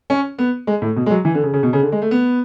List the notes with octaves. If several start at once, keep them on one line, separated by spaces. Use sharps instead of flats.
C#4
B3
G#3
A2
B2
G#3
F#3
E3
D3
C#3
C#3
B2
C#3
D3
G#3
A3
B3